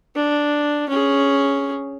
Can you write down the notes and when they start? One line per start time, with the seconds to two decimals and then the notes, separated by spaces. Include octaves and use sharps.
0.16 D4
0.89 C#4 G#4